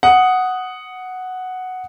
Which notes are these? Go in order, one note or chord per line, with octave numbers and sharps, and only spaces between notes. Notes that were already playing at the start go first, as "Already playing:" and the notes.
F#5 D#6